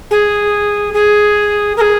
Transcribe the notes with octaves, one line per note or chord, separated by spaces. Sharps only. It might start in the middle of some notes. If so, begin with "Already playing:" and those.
G#4
G#4
A#4
G#4